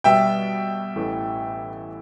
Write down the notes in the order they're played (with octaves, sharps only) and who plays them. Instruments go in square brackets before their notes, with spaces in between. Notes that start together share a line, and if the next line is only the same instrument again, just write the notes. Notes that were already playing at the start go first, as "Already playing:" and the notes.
[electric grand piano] B2 G3 B3 [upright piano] E5 G5
[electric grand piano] A1 A2 E3 A3